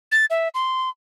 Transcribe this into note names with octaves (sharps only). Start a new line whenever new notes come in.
A6
E5
C6